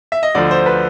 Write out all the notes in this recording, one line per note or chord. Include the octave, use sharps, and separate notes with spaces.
E5
D#5
D2 D3 F3 D5
C5
B4